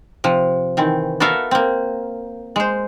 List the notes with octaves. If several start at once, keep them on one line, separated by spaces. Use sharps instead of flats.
C3 F3
D#3 E3 C4
B3 F#4 A4 A#4 E5 F5
A#3 C4
G#3 C5